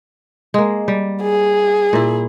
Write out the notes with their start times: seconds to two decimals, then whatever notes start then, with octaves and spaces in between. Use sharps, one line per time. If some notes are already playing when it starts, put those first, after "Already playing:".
0.54 G#3 A#3
0.88 G3
1.22 G#4
1.93 A#2 E4